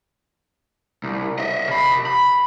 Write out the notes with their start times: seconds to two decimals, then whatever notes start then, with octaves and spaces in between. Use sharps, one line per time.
1.04 C2
1.39 D#5 E5
1.68 C3 B5
2.07 B5